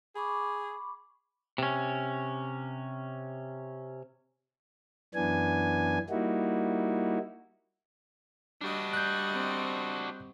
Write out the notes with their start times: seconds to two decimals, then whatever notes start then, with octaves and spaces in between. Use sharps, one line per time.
0.16 G#4 B5 C#6 D6
1.58 C3 C#4
5.14 F#2 E3 B3 D4 G#5
6.10 G3 A#3 D#4 E4 F#4
8.61 G3 D4 F#4 D#5
8.93 F#6 G6
9.34 C4